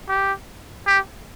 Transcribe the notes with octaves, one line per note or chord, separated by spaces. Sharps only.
G4
G4